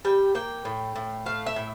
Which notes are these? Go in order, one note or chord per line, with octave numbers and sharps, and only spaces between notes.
G3 G5
A#3 G5
A2
A2
A3 F5
E5
A2